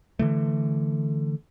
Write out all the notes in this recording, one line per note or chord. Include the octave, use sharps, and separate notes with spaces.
D3 E3 A3